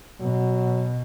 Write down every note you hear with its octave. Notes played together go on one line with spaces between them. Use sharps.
B2 F#3